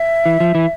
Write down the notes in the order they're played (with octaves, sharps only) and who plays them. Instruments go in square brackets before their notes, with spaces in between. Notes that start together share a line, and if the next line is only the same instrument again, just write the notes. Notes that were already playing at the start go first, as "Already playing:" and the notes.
Already playing: [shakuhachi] E5
[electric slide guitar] E3
F3
E3